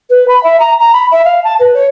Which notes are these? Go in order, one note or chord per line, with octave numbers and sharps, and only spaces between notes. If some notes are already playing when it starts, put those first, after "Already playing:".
B4
B5
E5
A#5
A#5
B5
E5
F5
A5
B4
C#5